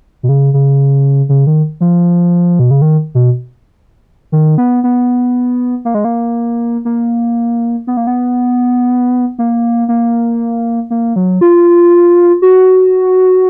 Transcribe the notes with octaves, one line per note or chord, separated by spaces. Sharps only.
B2
C#3
C#3
C#3
D#3
F3
B2
C#3
D#3
B2
D#3
B3
B3
A#3
G#3
A#3
A#3
B3
A#3
B3
A#3
A#3
A#3
F#3
F4
F#4